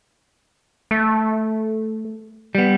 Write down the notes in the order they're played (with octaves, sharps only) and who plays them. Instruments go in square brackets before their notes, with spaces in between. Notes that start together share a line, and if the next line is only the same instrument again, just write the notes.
[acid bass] A3
[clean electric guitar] G3 B3